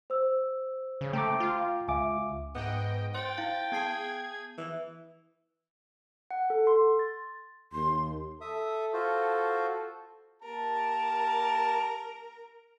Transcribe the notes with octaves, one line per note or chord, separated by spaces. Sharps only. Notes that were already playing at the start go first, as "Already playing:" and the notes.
C5 E6
C#3
A3 G5 A#5 D6
F4
C#2 E5 F5 G#5 D6
G#2 B3 D#5 G5
C5 G5 C6 A6
E4 F5
B3 G#4 A5 G#6 C7
E3
F#5
A4
C6
A6
D#2 C6
A4 E5 D#6
F4 F#4 C5
A#3 G4 A#4 A5